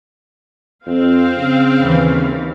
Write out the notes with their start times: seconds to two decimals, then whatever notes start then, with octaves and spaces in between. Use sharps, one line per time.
0.86 F2 C4 F5
1.37 C#3
1.79 D#2 E3